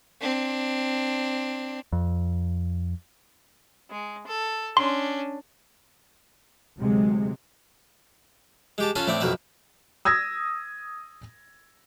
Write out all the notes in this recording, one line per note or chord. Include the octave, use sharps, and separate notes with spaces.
C4 D4
F2
G#3
A4
C#4 D4 C6
D2 C3 F#3 G#3
G#3 G4 A5
C#4 F4 A4 B4 G#5 A5
A2 A3 B3 C4 D5
B1 F2 B2 D#3 B4 E5
D#6 E6 G#6 A#6